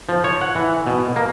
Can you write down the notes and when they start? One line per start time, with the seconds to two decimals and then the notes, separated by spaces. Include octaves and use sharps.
0.09 F3
0.24 C#5
0.41 F#5
0.55 E3
0.87 B2
1.16 A#3